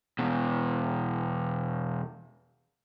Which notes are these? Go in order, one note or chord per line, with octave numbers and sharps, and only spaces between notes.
E2 B2